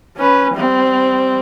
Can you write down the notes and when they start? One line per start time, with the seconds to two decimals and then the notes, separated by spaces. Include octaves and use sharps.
0.17 C#4 B4
0.55 G3 C4